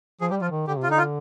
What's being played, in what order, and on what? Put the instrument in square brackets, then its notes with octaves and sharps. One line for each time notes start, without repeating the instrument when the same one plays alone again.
[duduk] F3 [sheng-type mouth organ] G#4
[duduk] G3 [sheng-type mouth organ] G4
[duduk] F3 [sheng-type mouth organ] F4
[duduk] D#3
[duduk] D3 [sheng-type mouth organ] G4
[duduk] C3 [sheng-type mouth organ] F4
[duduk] D3 [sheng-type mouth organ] D#4
[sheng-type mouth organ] F4